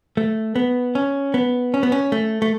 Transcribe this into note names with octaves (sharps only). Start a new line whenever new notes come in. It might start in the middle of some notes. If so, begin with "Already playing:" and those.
A3
B3
C#4
B3
C#4
B3
C#4
A3
A3